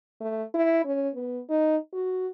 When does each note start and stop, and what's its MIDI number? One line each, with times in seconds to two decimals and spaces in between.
0.21 0.43 57
0.54 0.83 64
0.85 1.09 61
1.15 1.41 59
1.50 1.77 63
1.93 2.28 66